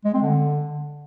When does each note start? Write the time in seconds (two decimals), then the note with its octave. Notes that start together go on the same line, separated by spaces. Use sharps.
0.05 G#3
0.14 C4
0.22 D3